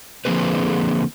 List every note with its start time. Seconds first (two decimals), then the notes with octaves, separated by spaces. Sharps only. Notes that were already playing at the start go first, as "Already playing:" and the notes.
0.25 D3 F3 A#3 C4 G#4 B4